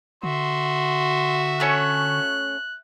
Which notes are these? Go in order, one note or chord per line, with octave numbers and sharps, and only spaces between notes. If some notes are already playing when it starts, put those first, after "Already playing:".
D3 F#4 E5 C6
A3 C#4 C#5 F#6